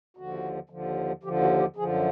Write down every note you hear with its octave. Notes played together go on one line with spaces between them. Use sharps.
D#2 D3 F3 F#4
D#2 D3 F3
D#2 D3 F3 G4
F#4
G4
F#2 D3 F3 G#4